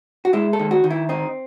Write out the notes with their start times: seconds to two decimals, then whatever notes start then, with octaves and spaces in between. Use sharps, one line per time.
0.25 F#4
0.33 G#3 E4
0.53 A4
0.59 D#3
0.71 F#4
0.84 D#3
0.90 E4
1.09 C4 D#4